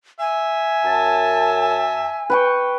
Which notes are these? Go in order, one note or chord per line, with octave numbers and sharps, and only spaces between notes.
E5 G#5
F#2 A5
B4 G5 C#6